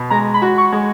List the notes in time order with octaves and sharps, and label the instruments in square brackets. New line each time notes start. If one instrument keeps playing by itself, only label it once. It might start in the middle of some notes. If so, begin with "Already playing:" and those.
Already playing: [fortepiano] B2
[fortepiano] G#3 [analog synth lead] A#5
[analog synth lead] B5
[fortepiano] F#4
[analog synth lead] C#6
[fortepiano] G#3